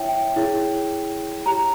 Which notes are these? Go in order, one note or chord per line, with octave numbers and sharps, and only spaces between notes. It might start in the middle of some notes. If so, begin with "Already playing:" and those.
Already playing: E4 C#5 E5 G5
E4 G#4 C#5
E4 G4 C#5 A#5